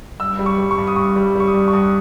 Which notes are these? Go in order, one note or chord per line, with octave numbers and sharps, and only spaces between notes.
G2 E6
G3
C#6
G3
C#6
G2
D#6
G2 C#6
G3
G3 C#6
D#6
G2
C#6
G2 D#6